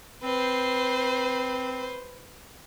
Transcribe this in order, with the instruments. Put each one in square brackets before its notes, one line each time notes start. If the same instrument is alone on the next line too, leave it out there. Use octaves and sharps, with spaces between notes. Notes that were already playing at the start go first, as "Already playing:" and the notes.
[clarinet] C4 [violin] B4 C5